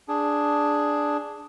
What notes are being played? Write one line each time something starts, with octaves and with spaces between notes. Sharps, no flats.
D4 G#4